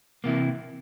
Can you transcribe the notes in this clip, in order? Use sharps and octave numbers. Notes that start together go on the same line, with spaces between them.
C3 E3 A#3